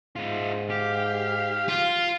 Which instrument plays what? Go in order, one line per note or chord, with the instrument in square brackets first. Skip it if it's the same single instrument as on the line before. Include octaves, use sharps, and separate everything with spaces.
[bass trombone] G#2 [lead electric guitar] D#4 F4
[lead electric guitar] G4 [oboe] F5
[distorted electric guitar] F4